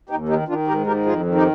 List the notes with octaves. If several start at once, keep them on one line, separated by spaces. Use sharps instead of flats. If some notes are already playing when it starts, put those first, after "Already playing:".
D#2 D#4 G4
D#3 D#4 G4
D#3 D4 F4
G#2 G4 A#4
D#3 G4 A#4
F2 F4 G#4
D#3
D#4 G4